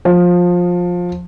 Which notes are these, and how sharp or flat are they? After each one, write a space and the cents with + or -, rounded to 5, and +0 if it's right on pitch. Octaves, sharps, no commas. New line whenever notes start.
F3 +20